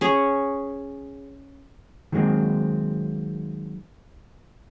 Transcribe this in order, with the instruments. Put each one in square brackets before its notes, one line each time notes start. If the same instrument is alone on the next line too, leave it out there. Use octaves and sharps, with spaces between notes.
[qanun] C#4 G#4 C#5
[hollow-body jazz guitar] D#3 F#3 G#3 A#3 C4